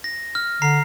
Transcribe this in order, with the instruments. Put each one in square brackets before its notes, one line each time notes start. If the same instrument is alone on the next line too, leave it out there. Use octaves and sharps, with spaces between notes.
[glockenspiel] A#6
F6
[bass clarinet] D3 [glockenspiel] A#5 C7